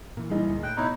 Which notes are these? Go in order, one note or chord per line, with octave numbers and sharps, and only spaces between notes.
A#2 E3
A#1 G3 D#4 E4 G#4
D2 A#2
A2 G5 F#6
B2 D#4 E4 C#5